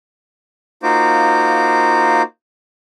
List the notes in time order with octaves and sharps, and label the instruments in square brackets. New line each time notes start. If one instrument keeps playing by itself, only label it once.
[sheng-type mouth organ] A#3 D#4 F4 F#4 C5 D6